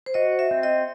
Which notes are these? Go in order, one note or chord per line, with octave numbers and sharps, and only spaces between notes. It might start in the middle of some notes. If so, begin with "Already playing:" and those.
C5
F#4 D#5
E5
C4
D#5